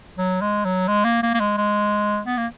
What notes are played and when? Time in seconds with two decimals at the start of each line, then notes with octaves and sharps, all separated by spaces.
0.18 F#3
0.41 G#3
0.65 F#3
0.88 G#3
1.05 A#3
1.23 A#3
1.34 A#3
1.40 G#3
1.57 G#3
2.27 B3
2.37 A#3